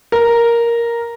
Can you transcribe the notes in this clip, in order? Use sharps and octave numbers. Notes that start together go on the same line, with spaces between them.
A#4